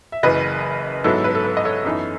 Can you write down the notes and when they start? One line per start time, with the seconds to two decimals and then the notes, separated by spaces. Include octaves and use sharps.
0.12 E5
0.23 F#1 F#2 E3 B4 D#5
1.04 G#2 F#3 B3 E4 A4
1.24 B4
1.35 A4
1.44 B4
1.57 D#5
1.65 A4 C#5
1.85 F#2 E3 B3 D#4